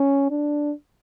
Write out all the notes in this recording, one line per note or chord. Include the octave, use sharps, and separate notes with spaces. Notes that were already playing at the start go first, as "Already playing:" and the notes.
Already playing: C#4
D4